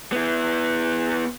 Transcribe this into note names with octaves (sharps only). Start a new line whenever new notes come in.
B3 E4